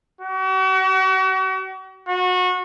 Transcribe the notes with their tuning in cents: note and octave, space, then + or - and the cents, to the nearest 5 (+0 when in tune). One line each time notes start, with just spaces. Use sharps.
F#4 +40
F#4 -25